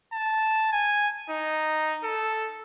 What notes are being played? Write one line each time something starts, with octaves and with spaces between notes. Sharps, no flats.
A5
G#5
D#4
A4